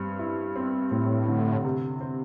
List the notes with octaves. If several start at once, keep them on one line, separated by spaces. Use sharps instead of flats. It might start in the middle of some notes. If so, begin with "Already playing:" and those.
Already playing: G2 C4
E4
C4
A2 C4
D3
C3
C4